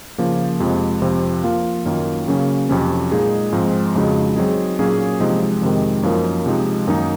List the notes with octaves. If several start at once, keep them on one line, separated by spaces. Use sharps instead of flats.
C#3 F3 A#3
F2 C3 F3 G#3
F2 C3 F3 C4
F3 A#3 F4
F#2 D#3 A#3 F4
C#3 F#3 A#3 C#4
F2 C3 F#3 C#4
A#2 G#3 D#4 G#4
G#2 F3 G#3 C4
F2 C#3 G#3 D#4 F#4
F#3 C4 D#4 G#4
A#2 F#3 A#3 C#4 G#4
C3 F3 G#3 D#4
F2 C3 D#3 G#3
F#2 F3 A#3 D#4 A#4
C3 F3 G#3 D#4
F#2 D#3 A#3 D#4